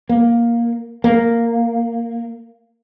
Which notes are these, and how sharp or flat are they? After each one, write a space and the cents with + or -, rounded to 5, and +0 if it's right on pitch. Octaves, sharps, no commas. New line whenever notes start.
A#3 +10
A#3 -5